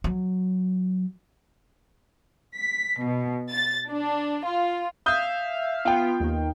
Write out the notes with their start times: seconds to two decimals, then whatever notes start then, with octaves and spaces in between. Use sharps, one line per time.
0.04 F#3
2.58 B6
3.01 B2
3.51 A6
3.90 D4
4.45 F4
5.06 E5 F5 D#6 G6
5.85 B3 F4 F5 G5
6.20 D#2 D#3